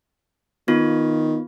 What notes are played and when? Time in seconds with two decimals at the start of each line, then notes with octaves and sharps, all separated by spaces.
0.68 D#3 B3 F4